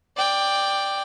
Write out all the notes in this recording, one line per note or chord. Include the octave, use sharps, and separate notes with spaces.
D5 G5